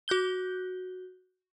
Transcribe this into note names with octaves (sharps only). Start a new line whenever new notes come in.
F#4 F#6 G6 G7